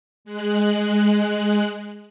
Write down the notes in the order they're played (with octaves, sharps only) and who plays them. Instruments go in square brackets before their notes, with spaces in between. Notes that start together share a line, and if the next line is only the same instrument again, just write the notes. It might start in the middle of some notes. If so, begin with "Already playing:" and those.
[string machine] G#3 F#6